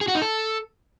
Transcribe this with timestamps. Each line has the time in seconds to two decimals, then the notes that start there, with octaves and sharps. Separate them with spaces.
0.01 G#4
0.08 F#4
0.15 D#4
0.22 A4